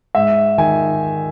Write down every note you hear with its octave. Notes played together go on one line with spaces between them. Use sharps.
G#2 E5
D#3 G#5